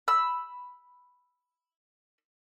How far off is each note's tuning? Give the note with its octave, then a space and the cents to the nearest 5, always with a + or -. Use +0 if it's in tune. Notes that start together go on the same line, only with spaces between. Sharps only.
B5 +0 E6 +0